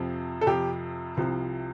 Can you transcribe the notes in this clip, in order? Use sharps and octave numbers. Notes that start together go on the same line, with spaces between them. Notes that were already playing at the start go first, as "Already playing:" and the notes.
Already playing: F2 C3 F3
A4
F2 C3 F3 G4
C2 C3 F3